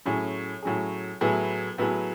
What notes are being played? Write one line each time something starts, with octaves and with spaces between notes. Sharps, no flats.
A2 F#3 C#4 G#4
A2 F#3 C#4 G#4
A2 F#3 B3 E4 G#4
A2 F#3 B3 E4 G#4